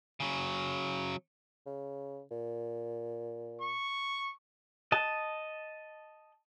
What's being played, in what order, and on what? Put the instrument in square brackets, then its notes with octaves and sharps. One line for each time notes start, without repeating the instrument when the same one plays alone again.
[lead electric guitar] C#3 F#3
[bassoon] C#3
A#2
[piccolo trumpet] C#6
[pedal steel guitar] D#5 A5